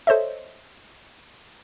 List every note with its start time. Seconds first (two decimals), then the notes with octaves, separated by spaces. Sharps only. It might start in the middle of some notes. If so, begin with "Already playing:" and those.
0.07 A4 C5 C#5 D#5 E5